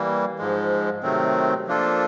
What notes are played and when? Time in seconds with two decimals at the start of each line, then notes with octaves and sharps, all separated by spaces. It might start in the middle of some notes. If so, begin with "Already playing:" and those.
Already playing: E3 G3 A#3
0.38 G#2 F3 G#3
1.03 C3 D#3 F#3 A3 C4
1.67 F3 A#3 D4 F4 A4